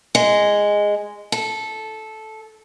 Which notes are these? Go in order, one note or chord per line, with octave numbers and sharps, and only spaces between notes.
G#3
A4